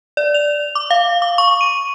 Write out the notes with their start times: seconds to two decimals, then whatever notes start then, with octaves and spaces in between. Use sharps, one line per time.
0.17 D5
0.34 F7
0.75 D6
0.90 F5
1.22 D6
1.38 C#6
1.61 D#7